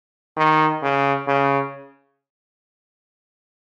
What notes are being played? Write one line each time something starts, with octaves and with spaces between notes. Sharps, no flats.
D#3
C#3
C#3